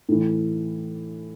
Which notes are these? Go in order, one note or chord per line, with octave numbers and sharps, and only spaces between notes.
A2 E3